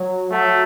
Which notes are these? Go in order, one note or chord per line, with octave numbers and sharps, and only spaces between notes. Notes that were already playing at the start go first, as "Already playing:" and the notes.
Already playing: F#3
F#3 A3